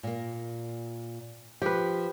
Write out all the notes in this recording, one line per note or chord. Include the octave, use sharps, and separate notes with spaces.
A#2 A#3
F3 G4 B4